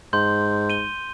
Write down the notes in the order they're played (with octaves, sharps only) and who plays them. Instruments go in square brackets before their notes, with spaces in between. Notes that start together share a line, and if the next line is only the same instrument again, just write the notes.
[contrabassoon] G#2 [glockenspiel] C6 G6
[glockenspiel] D#7 G7